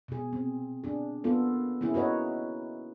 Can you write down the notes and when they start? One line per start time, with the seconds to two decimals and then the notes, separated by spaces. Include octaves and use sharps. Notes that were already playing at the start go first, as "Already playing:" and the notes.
0.08 B2 G#4
0.33 C4
0.84 D4 G#4
1.24 A#3 B3 F4 A4
1.81 A#3 C#4 E4 G#4
1.94 D#4 F#4 B4 C#5 D#5